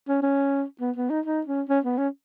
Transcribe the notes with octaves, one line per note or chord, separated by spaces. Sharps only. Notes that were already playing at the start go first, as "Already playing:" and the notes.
C#4
C#4
B3
B3
D#4
D#4
C#4
C#4
B3
C#4